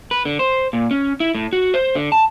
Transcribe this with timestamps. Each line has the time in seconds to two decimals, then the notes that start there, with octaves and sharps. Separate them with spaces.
0.11 B4
0.25 D3
0.39 C5
0.73 A#2
0.91 C#4
1.20 E4
1.35 A2
1.53 F#4
1.74 C5
1.95 D3
2.12 A5